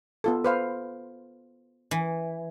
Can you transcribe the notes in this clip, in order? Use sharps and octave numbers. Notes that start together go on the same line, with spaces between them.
B3 F4 A4
B4 C5 F5
E3